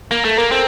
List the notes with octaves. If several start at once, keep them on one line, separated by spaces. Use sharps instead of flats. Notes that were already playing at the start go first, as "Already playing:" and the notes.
A#3 A#4
A3 A4
A#3 A#4
C4 A4 C5